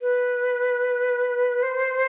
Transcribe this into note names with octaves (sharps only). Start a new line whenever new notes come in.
B4
C5